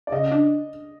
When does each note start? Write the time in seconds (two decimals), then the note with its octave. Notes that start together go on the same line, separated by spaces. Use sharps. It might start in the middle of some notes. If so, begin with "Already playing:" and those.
0.07 D5
0.12 C#3 D#5
0.31 D4